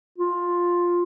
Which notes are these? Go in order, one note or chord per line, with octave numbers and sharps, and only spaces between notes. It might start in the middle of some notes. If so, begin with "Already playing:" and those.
F4